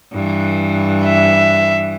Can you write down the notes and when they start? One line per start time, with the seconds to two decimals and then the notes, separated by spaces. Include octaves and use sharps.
0.12 G2 E3
1.05 E5